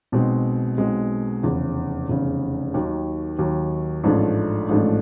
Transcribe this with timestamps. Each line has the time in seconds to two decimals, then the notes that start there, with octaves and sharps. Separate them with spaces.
0.12 B1 B2 G#3 C4
0.78 B1 B2 G#3 C4
1.43 F1 E2 C#3
2.08 F1 E2 C#3
2.74 D#2 D#3 F#3
3.38 D#2 D#3 F#3
4.04 A1 G#2 F3 A3 D4
4.69 A1 G#2 F3 A3 D4